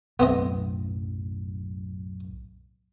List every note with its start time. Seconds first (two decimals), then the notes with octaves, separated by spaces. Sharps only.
0.19 B1 F#2 A2 B3 C4 D#5